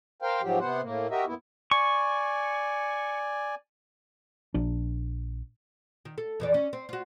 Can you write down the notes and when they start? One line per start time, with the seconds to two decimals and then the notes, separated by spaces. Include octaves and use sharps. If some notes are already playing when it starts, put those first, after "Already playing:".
0.22 A#4 C5 F5 G5
0.42 G#2 F3 F#3 G4
0.60 C3 B3 C5 F#5
0.82 A2 A#3
1.10 F#4 G4 A#4 D#5 E5
1.27 F2 A#2 B3 E4
1.71 D5 G#5 C#6
4.54 A#1 D4
6.05 D#3
6.18 A4
6.40 F2 E3 D5
6.54 C#4
6.73 C4
6.89 F4 F#4